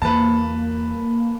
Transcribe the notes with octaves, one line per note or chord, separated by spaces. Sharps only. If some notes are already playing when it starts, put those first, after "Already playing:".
E2 G3 A#3 B4 A5